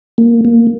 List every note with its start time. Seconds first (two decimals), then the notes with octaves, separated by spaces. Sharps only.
0.18 A#3
0.45 A#3